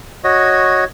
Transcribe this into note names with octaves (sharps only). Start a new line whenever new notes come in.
F#4 C#5 D#5